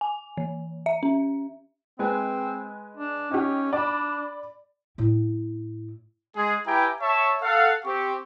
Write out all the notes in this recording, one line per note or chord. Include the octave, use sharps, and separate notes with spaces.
G#5
E3
E5
C#4
G#3 C4 B4 G#5
D4
C#4 D#4 G4
D4 D5 B5
A2 E4
G#3 G#4
E4 G4 B4 G5 G#5 A#5
C#5 E5 A5 C#6
A4 F5 F#5
C4 G4 C#6